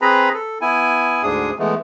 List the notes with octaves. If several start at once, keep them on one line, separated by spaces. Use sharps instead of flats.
C4 G#4 B4 A#5 B5
A4
B3 E4 G#5
D2 G#2 D4 G#4 D#6
E3 G#3 A3 B3